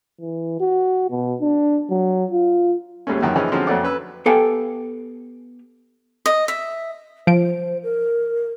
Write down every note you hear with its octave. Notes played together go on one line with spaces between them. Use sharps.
E3
F#4
B2
D4
F#3
F4
D#2 G#2 G3 A3 C#4
F#2 D#3 E3
C#3 E3 F3 C#4 D#4
D3 F3 F#3 G#3 C4 C#4
F2 F#3 A3 D5 F#5 D6
C#4 B4 E6
B3 G4 A4 F5 G5 G#5
D#5
E5
F3 C5 D7
A#4